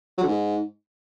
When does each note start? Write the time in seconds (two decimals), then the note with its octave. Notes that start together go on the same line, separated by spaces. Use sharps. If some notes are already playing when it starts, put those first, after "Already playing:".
0.17 F#3
0.23 D3
0.28 G#2